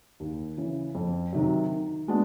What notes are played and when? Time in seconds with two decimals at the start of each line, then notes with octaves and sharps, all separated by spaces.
0.20 D#2
0.57 C#3 E3
0.95 F2
1.33 C3 D#3 F#3
1.71 D#3
2.08 G#3 B3 D4